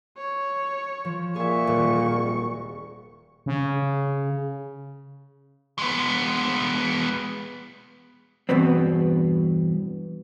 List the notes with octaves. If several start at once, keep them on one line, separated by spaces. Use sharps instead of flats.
C#5
F3
A#2 G#4 E5 C#6
D#1
G#1
C#3
G#3 B3
E2 G2 B2 B3 C4